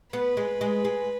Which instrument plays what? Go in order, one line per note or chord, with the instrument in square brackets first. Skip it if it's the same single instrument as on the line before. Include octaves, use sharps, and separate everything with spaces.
[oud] B3 [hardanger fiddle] B4
[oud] G#3
G#3
G#3